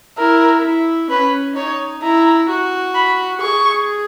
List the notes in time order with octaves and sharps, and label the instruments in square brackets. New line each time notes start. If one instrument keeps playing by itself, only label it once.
[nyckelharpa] E4 [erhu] A#4
[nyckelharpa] E4
[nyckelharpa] C#4 [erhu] B4
[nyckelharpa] D#4 [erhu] C#5
[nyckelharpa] E4 [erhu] A#5
[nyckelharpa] F#4
[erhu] B5
[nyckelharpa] G#4 [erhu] C#6